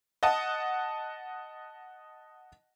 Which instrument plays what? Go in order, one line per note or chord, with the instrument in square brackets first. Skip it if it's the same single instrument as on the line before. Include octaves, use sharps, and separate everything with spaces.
[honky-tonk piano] D#5 F#5 A5 D#6